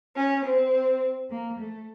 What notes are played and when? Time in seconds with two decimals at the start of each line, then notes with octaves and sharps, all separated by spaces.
0.16 C#4
0.44 C4
1.30 A#3
1.59 A3